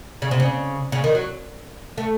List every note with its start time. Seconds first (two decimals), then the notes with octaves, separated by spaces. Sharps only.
0.22 C#3
0.31 C3
0.40 C#3
0.92 C#3
1.04 D#3
1.15 F#3
1.98 A3